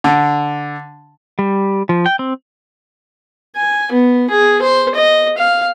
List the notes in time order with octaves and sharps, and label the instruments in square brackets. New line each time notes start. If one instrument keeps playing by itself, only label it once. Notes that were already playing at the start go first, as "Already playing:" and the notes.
[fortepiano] D3
[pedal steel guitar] G3
F3
G5
C4
[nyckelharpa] G#5
B3
G#4
C5
D#5
F5